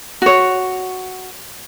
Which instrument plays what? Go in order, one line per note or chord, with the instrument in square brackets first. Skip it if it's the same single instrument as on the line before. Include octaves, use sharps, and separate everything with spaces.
[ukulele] F#4 C#5